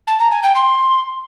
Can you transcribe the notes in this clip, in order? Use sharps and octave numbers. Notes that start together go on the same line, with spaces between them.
A5
A#5
G#5
G5
C6